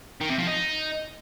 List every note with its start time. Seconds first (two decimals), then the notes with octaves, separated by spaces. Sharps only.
0.20 D#3
0.29 C3
0.38 F3
0.47 D#4